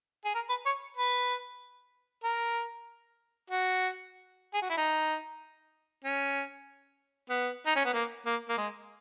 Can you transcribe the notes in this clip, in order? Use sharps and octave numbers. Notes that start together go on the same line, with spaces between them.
G#4
A#4
B4
C#5
B4
A#4
F#4
G#4
F#4
E4
D#4
C#4
B3
D#4
C#4
B3
A#3
A#3
A#3
G#3